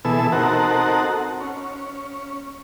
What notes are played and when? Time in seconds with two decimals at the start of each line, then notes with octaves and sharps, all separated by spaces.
0.05 B2 E3 B3 G#4 A4 E6
0.32 C4 D#4 F#4 A4 A#4 F#5
1.41 C#4